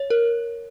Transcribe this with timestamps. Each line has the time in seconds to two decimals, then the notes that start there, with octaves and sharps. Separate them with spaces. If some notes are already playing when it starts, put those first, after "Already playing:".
Already playing: C#5
0.10 A#4